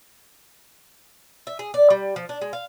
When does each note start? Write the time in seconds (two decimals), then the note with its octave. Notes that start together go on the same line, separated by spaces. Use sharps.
1.47 E5
1.59 G#4
1.74 D5
1.90 G3
2.16 F3
2.29 D4
2.42 G#3
2.53 F5